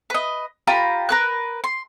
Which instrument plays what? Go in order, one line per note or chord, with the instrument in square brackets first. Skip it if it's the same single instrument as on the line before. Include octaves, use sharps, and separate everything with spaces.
[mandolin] B4 D#5
F4 G4 A#5 B5
A#4 B4 F#6
C6